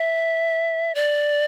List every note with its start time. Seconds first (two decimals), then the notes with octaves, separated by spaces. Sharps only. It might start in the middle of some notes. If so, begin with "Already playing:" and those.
Already playing: E5
0.95 D5